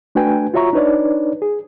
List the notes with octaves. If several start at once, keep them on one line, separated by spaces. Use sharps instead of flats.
A3 D4 F#4 B4 G5 G#5
F4 F#4 C#5 E5 A#5 C#6
D4 D#4 B4 C#5 D5
G#4